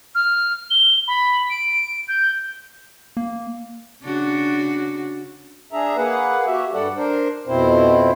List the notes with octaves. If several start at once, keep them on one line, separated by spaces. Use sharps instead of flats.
F6
G7
B5
D7
G6
A#3
C#3 D4 F#4
D4 G#4 E5 A#5
A#3 G#4 B4 F#5
F#4 G4 E5
G2 G3 A4 D5 F#5
D4 A#4 C5
F2 B2 C4 E4 C5